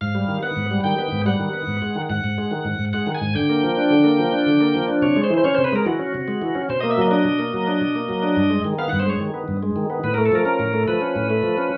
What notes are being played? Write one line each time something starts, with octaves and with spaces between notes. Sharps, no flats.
G#2 F5
G3
D#3
B3 F#5
G#2
G3
D#3 G5
B3
G#2
G3 F#5
D#3
B3
G#2
G#3
D#3
G#2 F#5
G#2
G#3
D#3
G#2
G#2
G#3 F#5
D#3
G#5
G#2
D3 G5
A#3
F3
D4
D3
A#3
F3
D4
D3
A#3
F3
D4
C3 C#5
G#3
C5
E3
C5
C#4 C#5
C3 C5
B4
G#3 A#4
E3 F#4
C#4
C3
G#3
E3
C#4
B2 C5
A#3 D#5
E5
F#3 D#5
D4 D#5
B2
A#3
F#3
D4
B2
A#3
F#3
D4
G2
G#3
D#3
B3 F5
G2 F#5
C5
G#3 C#5
D#3
B3
G2
G#3
D#3
B3
A2 B4
A3 A#4
A4
F3 A#4
C#4 A#4
A2
A3
F3 B4
C#4
A2
A3
F3
C#4